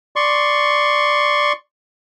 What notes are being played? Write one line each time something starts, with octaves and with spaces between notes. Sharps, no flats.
D5 C6 C#6